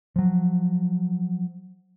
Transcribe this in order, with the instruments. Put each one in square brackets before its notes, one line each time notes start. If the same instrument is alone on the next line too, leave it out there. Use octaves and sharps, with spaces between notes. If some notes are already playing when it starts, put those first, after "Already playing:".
[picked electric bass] F3 F#3